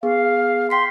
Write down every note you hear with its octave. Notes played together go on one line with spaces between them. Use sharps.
B3 G#4 F5
G5 C6 B6 C7